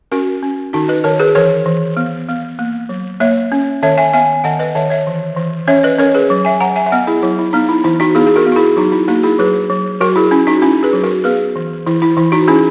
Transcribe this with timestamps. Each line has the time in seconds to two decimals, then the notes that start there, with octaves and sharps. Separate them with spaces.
0.12 C#4 F#4 A#4
0.43 C#4
0.73 D#3 D#4 F#4
0.88 B4 D#5
1.04 D#3 A#4 C#5
1.20 G#4 B4
1.35 E3 A#4 C#5
1.66 E3
1.97 B3
2.29 B3
2.59 A#3
2.89 F#3
3.20 A#3 C#5 E5
3.52 C#4
3.83 D#3 C#5 E5
3.98 E5 G#5
4.13 B3 E5 G#5
4.44 D#3 D#5 F#5
4.59 B4 D#5
4.75 D#3 C#5 E5
4.90 C#5 E5
5.07 E3
5.37 E3
5.67 C#4 C#5 E5
5.83 B4 D#5
5.98 C#4 A#4 C#5
6.14 G#4 B4
6.30 F#3
6.45 E5 G#5
6.60 F#3 F#5 A#5
6.76 E5 G#5
6.86 E5
6.92 B3 D#5 F#5
7.07 E4 G#4
7.22 F#3 E4
7.39 E4
7.53 B3 D#4
7.69 E4
7.84 E3 E4
8.00 D#4 F#4
8.15 B3 E4 G#4
8.27 G#4
8.36 F#4 A#4
8.46 B3
8.52 F#4
8.56 E4 G#4
8.77 F#3 D#4 F#4
8.92 E4
9.08 A#3 D#4 F#4
9.23 E4 G#4
9.39 F#3 G#4 B4
9.70 F#3
10.00 F#3 F#4 A#4
10.16 E4 G#4
10.31 C#4 E4
10.47 D#4 F#4
10.62 C#4 E4
10.83 G#4 B4
10.93 F#3
11.03 F#4 A#4
11.24 B3 G#4 B4
11.56 E3
11.87 E3 E4
12.02 E4
12.17 E3 E4
12.32 D#4 F#4
12.47 C#4 E4 G#4